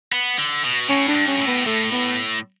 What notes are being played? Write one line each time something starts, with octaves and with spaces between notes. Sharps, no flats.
B3
D3
B2
A2 C#4
D4
G2
C#4
B2
A2
B3
A2 A3
B3